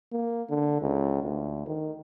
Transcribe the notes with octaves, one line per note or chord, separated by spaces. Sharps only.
A#3
D3
C#2
D2
D#3